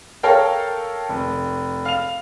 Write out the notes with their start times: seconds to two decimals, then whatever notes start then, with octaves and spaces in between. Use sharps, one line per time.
0.23 A4 A#4 C#5 F5 G5
1.09 F1
1.85 F5 F7